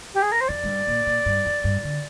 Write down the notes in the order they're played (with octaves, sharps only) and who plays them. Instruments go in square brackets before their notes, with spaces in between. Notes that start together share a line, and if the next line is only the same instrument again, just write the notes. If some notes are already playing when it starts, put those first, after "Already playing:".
[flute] G4
G#4
A#4
C5
[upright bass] F2 [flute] D5
[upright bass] G#2
G2
A#2
A#2
G2
F2
G2
D3